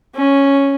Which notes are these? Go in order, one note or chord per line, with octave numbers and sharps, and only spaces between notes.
C#4